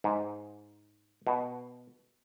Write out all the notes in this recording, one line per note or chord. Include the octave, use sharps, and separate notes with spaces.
G#2
B2